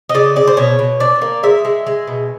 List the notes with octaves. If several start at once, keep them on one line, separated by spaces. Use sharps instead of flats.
D#5
C#3 D5
C#3 D5
C5
B2 C#5
B2
D4 D5
A#3
G#3 E5
G#3
G#3
B2